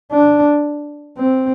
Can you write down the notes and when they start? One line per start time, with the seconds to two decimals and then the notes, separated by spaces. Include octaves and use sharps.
0.12 D4
1.18 C4